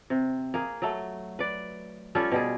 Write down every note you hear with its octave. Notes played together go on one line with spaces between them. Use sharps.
C3
A#3 G#4
F#3 A3
B4 D5
G3 C#4 F4 A4
B2 G3 G#4